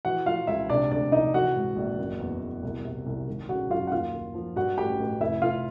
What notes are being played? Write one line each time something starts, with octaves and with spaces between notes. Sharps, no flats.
E3 F#4 F#5
E3 F4 F5
C#2 E4 E5
C3 D4 D5
D2 D4 D5
C3 D#4 D#5
E3 F#4 F#5
G#2
A#1
F#1
E2
E2
C2
C3
C2
G#1
C#3 F#4 F#5
F#2 F4 F5
F#5
D#2 F4 F5
D#2
F3
G2 F#4 F#5
A1 G4 G5
A1
F1 E4 E5
F1 F4 F5